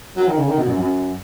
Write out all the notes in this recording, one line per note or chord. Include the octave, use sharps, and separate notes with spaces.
F#3
D#3
C#3
D#3
B2
F#2
F#2